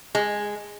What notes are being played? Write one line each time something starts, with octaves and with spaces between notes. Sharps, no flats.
G#3